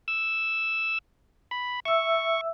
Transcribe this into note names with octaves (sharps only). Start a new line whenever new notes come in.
E6
B5
E5 C#6 E6